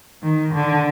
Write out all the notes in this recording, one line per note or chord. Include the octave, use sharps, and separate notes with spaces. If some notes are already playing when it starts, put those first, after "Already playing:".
D#3
D3